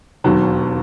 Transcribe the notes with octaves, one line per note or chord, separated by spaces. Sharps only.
E1 D#2 D#3 F#3